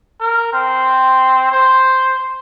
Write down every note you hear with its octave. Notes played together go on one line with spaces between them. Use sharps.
A#4
C4
C5